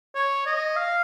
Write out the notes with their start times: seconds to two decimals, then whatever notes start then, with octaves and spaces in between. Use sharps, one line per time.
0.15 C#5
0.46 D#5
0.76 F5